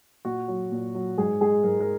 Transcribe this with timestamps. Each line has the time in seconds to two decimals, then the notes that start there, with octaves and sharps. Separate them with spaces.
0.25 A#2 F#4
0.48 F#3
0.71 A#2
0.95 F#3
1.18 G#2 G#4
1.41 G#3 G#4
1.64 G#2 A#4
1.81 A#4